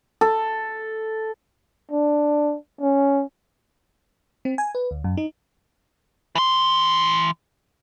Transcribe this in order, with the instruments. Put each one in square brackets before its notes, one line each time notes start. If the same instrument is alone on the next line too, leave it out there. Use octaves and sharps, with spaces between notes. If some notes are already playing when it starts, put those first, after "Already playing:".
[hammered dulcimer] A4
[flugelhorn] D4
C#4
[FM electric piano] C4
G#5
B4
D2
F#2
D#4
[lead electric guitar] E3 C6